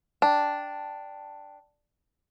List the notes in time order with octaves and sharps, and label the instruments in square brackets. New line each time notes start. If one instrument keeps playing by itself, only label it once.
[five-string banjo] D4 [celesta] G5 A5